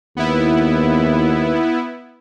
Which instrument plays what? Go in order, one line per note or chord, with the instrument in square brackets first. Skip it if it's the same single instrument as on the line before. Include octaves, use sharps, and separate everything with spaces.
[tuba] D#2 [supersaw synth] B3 E4